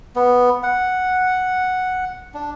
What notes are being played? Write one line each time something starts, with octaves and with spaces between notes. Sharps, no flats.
B3
F#5
D4